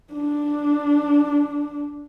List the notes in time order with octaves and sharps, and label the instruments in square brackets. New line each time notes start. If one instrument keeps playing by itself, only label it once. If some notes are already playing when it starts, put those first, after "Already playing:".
[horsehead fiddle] D4